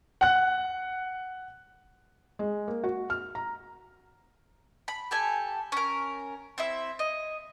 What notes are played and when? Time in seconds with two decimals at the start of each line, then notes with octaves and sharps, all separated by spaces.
0.21 F#5 F#6
2.39 G#3
2.68 A#3
2.84 F#4
3.10 F6
3.35 A#5
4.88 B5
5.11 G4 A4 G#5
5.72 C#4 A#4
6.58 C4 E4 E5
6.99 D#5